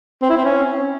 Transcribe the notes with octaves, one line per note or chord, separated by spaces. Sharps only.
C4
E4
C4
C#4